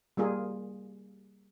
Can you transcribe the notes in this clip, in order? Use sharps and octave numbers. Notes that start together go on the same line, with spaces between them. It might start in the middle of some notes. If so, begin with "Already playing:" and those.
G3 A#3 F4 G#4